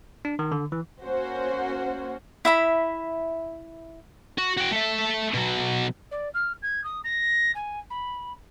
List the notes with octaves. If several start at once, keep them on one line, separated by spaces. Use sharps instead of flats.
D4
D#3
D3
E3
A#3 C#4 F#4 C5
E4 E5 B5
F#4
F#4 G5
A3 E5
B2 F#3
D5
F6
G#6
D#6
A#6
G#5
B5